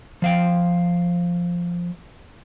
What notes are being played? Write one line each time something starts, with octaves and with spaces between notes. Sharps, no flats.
F3 F5 G5